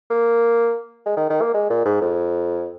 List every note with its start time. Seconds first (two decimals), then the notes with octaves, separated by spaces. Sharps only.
0.10 A#3
1.06 G#3
1.17 D#3
1.30 D#3
1.41 A#3
1.54 G#3
1.70 A#2
1.85 G#2
2.01 F2